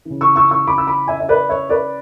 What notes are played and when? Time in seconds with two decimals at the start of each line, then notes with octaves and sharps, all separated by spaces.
0.05 C#3 E3
0.21 C#6 E6
0.36 C#6 E6
0.51 C#6 E6
0.67 B5 D6
0.78 E6
0.87 B5 D6
1.08 E5 G#5
1.20 E5
1.29 B4 D5
1.49 C#5 E5
1.69 B4 D5